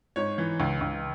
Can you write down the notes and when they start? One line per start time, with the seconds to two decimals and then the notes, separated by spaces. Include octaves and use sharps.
0.16 G#2 C#5
0.38 E3
0.60 C#2
0.81 C#2